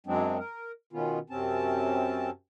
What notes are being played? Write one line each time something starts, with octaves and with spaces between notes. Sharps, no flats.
F#2 F#3 G#3 C4 D4
A#4
B2 D#3 B3 C#4 F4
F#2 C3 C4 C#4 A5